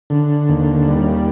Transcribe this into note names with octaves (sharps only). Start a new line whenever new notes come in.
D3
D#2
G3